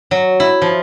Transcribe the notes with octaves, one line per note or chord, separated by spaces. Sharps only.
F#3
E4
F3